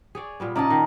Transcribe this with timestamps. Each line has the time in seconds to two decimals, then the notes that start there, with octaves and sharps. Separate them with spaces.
0.15 G#4 C#5 D5
0.40 A#2 G3 B3
0.56 C#3 D#4 D5 D#5 A5
0.70 D#3